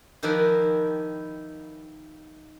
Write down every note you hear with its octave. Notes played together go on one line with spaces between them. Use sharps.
D#3 F3 E4 G4 A#4 B4